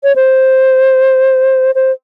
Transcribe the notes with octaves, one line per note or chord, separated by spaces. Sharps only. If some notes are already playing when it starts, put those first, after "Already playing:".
C#5
C5
C5